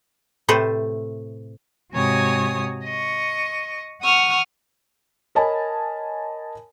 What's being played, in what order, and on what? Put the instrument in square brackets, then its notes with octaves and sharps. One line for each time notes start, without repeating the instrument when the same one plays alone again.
[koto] A2 C3 A3 A4 B4 C5
[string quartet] G#2 C3 F#4 C#5 G#5 D#6
D#5 C#6
F#5 C#6 D#6 F6
[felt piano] A#4 C#5 D#5 G#5 A5 B5